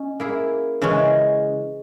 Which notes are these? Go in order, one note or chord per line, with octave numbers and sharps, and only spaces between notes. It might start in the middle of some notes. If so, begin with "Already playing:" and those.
Already playing: C#4 D#5
A#3 E4 G#4
C#3 E3 G#3 C#4